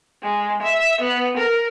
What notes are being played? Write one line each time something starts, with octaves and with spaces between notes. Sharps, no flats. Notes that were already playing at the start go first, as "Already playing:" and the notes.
G#3
E5
B3
A#4